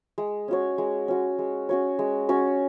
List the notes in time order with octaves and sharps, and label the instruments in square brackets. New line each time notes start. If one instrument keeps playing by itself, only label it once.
[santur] G#3
C#4 F#4 C#5
G#3
C#4 F#4 C#5
G#3
C#4 F#4 C#5
G#3
C#4 F#4 C#5